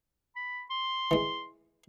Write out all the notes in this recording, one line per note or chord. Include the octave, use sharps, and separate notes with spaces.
B5
C6
E3 G#3